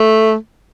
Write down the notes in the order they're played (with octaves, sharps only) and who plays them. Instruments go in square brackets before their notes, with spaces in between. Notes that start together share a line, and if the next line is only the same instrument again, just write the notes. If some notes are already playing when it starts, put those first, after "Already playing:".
Already playing: [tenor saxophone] A3